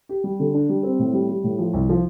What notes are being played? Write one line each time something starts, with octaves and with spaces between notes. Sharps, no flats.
G4
G3
D3
D4
G3
C4
A2
G3
G3
A2
F3
C2
F3